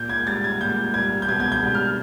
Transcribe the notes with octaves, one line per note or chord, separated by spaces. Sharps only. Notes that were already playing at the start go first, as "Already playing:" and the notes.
Already playing: A#2 G6
G#6
G3 A6
G#6
A#2 G6
G3 G#6
G6
B2 G#6
G#6
G6
G3
F6